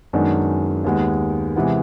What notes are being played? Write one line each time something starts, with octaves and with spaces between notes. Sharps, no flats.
F#2 D#3 G#3 B3 D4
D#2 D#3 G#3 B3
C3 E3 G#3 B3